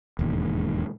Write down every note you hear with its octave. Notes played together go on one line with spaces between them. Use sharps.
E1 D#2 G#2